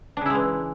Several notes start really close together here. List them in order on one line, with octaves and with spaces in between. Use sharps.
D4 C#3 E4 G#3 E3